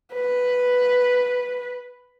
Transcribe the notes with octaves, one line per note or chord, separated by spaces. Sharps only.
B4